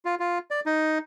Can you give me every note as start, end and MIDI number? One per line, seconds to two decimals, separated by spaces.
0.05 0.15 65
0.19 0.39 65
0.51 0.60 74
0.66 0.98 63